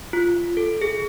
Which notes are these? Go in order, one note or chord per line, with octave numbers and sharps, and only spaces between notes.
F4
A4
G#4